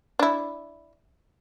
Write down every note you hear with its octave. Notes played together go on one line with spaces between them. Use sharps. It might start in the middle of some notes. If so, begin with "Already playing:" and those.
D4 E4